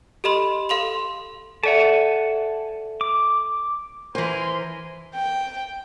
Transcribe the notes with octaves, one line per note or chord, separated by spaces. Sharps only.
G4 A4 D#5 B5 C6
A4 F5 C6 F7
A4 D5 E5 F#5 G#5 A5
D6
E3 A#4 C5 G#5 C6
G5